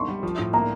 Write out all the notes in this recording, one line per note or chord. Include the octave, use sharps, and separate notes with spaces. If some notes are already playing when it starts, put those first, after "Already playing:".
Already playing: C6 C#6
G3
F3
A2
A#3 A#5